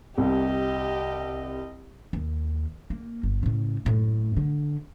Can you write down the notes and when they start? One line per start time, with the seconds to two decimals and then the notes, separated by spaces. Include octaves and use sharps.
0.18 C2 G4 D#5
2.13 D#2
2.90 A#3
3.23 G1
3.43 A2 C#3
3.85 F#1 A2
4.37 D3